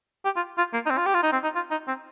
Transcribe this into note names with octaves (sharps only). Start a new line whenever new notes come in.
G4
F4
F4
A#3
D#4
C4
F4
G4
F4
D#4
C4
D#4
F4
D#4
C4